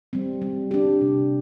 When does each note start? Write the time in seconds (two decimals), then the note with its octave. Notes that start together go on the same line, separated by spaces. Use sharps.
0.13 G3 C4
0.42 G3
0.71 D4 G4
1.01 C3